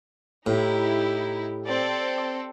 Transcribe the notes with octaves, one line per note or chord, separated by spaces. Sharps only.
A2 D#4 E4 G4
C4 A4 D5